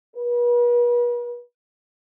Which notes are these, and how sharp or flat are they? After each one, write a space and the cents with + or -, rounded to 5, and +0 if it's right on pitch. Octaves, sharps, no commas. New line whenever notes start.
B4 -40